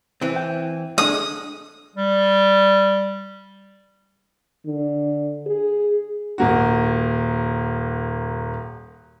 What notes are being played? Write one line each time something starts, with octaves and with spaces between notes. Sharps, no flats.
E3 C4
G5
G#3 D4 A4 D#6
G3
D3
G#4
D#1 A#3 F#4